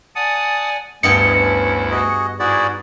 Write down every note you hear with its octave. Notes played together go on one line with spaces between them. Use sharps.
D5 F#5 G#5 A5 D#6
D2 G2 B3 E4 G#4 D#5 G5 C#7
C#4
F#4 G#4 D#5
G#2 E4 F#4 G#4 D5